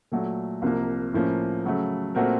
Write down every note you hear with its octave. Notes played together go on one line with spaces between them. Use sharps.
A#2 F#3 A3
C2 C3 F3 A#3
A2 F3 A#3 C#4
C#3 F#3 A3
A#2 A3 C4 F#4 A#4